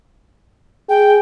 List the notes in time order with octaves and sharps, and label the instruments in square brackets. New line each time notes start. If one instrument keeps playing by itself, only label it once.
[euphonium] G#4 [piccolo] G5